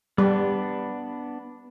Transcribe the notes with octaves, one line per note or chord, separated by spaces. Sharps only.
G3 B3 D4